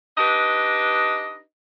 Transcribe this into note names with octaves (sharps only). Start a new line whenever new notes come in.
D4 D#4 G4 B4 D#5